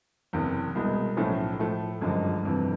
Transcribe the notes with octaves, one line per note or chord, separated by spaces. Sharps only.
F#1 E2 C3
C2 B2 G#3
B1 A2 F3 A3 C#4
A2 F3 A3
G1 F#2 D3 F3 G#3
G1 F2 C3 E3